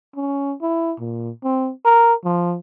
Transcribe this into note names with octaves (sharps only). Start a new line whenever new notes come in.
C#4
E4
A#2
C4
A#4
F3